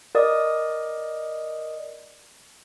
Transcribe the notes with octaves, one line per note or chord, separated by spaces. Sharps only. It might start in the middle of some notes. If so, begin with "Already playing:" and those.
A#4 D5 D#5 D#6